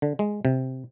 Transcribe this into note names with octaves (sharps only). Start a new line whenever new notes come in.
D3
G#3
C3